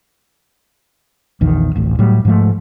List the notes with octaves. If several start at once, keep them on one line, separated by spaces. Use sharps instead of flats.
A#1 E2 D#3
D1 A1
A2 F#3 G3
G#2 F3 A3